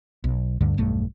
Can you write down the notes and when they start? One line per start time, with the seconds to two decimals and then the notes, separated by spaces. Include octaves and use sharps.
0.24 B1
0.61 D2 G2 D3
0.77 E1 B1 G2 A3